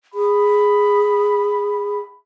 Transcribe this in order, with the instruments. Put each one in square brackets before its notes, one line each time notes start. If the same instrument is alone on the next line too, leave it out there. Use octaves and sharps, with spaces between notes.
[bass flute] G#4 [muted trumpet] B5